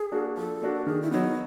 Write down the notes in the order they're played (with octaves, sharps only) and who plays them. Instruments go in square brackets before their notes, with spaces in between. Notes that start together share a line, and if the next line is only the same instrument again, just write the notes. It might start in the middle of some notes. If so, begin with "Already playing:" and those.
Already playing: [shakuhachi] G#4
[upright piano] A#3 D4 F#4
[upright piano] F3 [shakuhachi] A4
[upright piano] A#3 D4 F#4
[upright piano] D#3 [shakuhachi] G#4
[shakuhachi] E4
[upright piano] F#3 B3 [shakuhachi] D#4